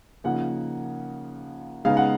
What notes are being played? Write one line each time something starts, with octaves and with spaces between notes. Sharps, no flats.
C#3 F3 A#3 D#4 F#5
C#3 G#3 B3 D#4 F5
F#5